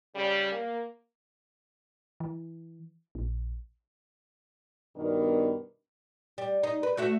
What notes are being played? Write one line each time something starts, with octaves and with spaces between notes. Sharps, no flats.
C#3 G3
A#3
E3
A#1
G2 B2 D#3 B3 D4 A#4
G3
D#4
B4
A3 F#4 E5